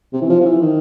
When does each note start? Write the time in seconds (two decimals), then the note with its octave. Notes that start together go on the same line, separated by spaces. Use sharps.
0.13 C3
0.22 E3
0.30 F3
0.41 F3
0.45 E3
0.61 D#3